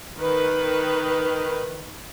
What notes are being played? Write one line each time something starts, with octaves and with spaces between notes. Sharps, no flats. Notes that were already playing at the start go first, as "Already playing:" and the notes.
D#3 B4